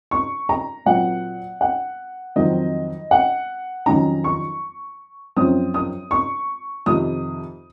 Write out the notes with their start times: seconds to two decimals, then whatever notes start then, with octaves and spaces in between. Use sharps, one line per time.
0.11 C#6
0.49 A#5
0.86 A#2 F#3 C4 F#5
1.61 F#5
2.36 F2 D#3 F#3 C4 D#5
3.11 F#5
3.86 F2 D#3 F#3 C#4 A#5
4.24 C#6
5.36 F#2 F3 C4 D#6
5.74 D#6
6.11 C#6
6.86 F2 C3 D#3 D#6